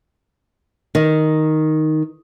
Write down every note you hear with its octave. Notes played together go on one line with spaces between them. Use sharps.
D#3